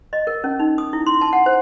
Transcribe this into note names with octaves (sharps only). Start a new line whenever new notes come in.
D#5
A#4
C#4
D#4
D#6
E4
C6
A5
F#5
C5